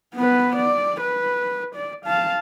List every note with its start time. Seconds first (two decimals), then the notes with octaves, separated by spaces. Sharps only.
0.15 B3 B4
0.56 D5
1.01 B4
1.75 D5
2.06 F5 A5